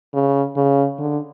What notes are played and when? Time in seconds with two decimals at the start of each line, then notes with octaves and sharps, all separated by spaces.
0.14 C#3
0.56 C#3
0.99 D3